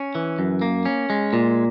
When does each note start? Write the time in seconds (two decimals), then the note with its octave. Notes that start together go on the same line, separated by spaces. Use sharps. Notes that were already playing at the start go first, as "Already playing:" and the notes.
Already playing: C#4
0.15 E3
0.39 F#2
0.62 A#3
0.85 C#4
1.10 G#3
1.33 A#2